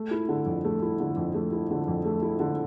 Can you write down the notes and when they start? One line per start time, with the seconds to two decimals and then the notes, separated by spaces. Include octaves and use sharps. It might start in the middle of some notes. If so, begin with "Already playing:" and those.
Already playing: A3
0.11 E4
0.29 D3
0.46 F2
0.64 A3
0.82 E4
1.00 D3
1.16 F2
1.34 A3
1.52 E4
1.70 D3
1.88 F2
2.05 A3
2.22 E4
2.40 D3